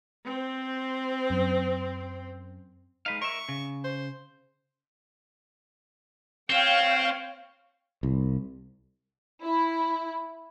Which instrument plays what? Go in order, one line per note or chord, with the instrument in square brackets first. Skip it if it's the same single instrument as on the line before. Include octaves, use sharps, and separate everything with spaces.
[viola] C4 C5
[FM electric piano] F#2
[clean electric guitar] G#3 B4 F5 [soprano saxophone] D#4
[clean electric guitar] A#4 E5 [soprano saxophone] C#6
[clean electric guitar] C#3
[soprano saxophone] C5
[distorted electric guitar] C4 [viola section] C#5 F5 G5
[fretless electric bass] C2
[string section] E4